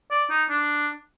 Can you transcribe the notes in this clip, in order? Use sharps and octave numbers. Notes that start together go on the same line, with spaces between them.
D5
D#4
D4